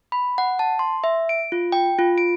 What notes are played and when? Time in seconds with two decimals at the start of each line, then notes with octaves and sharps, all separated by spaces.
0.12 B5
0.38 F#5
0.59 A5
0.79 C6
1.04 E5
1.29 D7
1.52 F4
1.72 G5
1.99 F4
2.18 D7